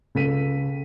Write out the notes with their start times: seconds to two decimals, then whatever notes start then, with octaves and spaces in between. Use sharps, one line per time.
0.15 C#2 A4 B6 D#7